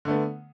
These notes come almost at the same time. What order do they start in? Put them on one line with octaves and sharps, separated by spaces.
D3 A3 B3